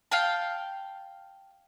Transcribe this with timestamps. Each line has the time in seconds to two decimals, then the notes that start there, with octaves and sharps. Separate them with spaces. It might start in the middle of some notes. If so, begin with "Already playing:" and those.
0.12 F5 G5 A5